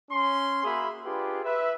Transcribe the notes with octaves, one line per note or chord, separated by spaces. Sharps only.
C#4 C6
A#3 F#4 G#4 E5 B5
D4 F4 G4 G#4 B4
B4 E5